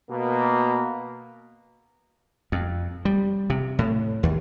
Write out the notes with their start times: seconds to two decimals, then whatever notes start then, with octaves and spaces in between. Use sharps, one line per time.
0.10 B2 A#3
2.52 F2
3.05 G3
3.50 C3
3.79 A2
4.23 D#2